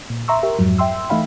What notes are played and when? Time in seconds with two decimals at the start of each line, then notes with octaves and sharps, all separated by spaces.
0.10 A#2
0.28 E5 A#5 C6 C#6 E6
0.43 G4 A#4 E5
0.59 F2 G#2 F#3
0.78 E5 G5 C6 E6
1.10 E3 A3 D#4 E5 F5 B5